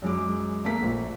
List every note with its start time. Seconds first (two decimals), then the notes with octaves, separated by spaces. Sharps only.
0.02 F#2 G#3 D6
0.65 A3 A#3 B6
0.82 A#1